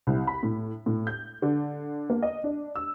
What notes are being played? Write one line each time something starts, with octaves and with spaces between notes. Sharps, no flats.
C2
B5
A2
A2
G6
D3
A#3
D#5
D4
E6